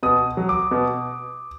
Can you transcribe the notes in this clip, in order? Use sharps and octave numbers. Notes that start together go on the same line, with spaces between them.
B2 D#6
F#3
D6
B2